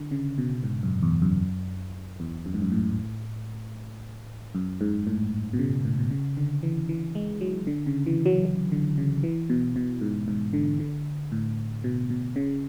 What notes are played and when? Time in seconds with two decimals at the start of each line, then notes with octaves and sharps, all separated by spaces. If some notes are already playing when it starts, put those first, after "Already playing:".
Already playing: D3
0.11 C#3
0.38 B2
0.64 G#2
0.83 F#2
1.02 E2
1.22 F#2
2.20 E2
2.46 F#2
2.54 G#2
2.62 F#2
2.72 A2
4.55 F#2
4.81 G#2
5.07 A2
5.53 B2
5.59 C#3
5.85 A2
5.99 B2
6.11 C#3
6.37 D3
6.63 E3
6.89 E3
7.15 G#3
7.41 F#3
7.67 D3
7.87 C#3
8.06 E3
8.26 F#3
8.45 F#3
8.72 D3
8.98 C#3
9.23 E3
9.50 B2
9.76 B2
10.01 G#2
10.28 G#2
10.53 D3
10.80 D3
11.32 A2
11.84 B2
12.10 B2
12.36 C#3